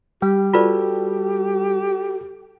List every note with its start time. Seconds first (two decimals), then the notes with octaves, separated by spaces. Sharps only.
0.22 G3 G4
0.53 F4 F#4 A4 B4 D5